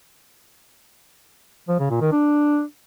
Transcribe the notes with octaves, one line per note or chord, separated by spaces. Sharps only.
F3
C#3
A#2
D#3
D4